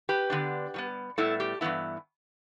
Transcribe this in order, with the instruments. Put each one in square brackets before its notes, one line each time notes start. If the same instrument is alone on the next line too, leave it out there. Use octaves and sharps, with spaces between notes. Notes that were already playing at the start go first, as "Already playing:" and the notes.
[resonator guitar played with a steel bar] G4 B4
D3 B3 D4
A2 G3 B3
A2 G3 B3 E4 A4
G4
G2 E3 G3 B3 E4